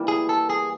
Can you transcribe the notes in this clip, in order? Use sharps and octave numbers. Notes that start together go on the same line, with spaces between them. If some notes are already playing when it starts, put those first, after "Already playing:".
Already playing: E3 G3 A#3
G#4
A4
G#4